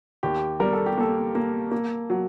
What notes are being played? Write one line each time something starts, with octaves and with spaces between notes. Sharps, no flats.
D#2 G4
G3 A#4
A4
G4
A#3 A4
A#3
A#3
F#3